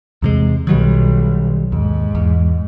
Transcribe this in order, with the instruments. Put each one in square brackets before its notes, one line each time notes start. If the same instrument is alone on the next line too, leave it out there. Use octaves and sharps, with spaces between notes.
[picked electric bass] E2 C3 G#3
[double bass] B1 [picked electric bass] D#3 F#3 G3
[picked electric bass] D#2 [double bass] G#2
[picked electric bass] E2